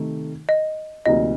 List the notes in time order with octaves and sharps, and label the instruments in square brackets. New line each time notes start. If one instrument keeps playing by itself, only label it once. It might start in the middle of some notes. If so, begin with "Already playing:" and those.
Already playing: [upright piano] C3 D#3 A3 D#4
[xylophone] D#5
[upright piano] D2 C3 F3 A#3 D#4 [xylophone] D#5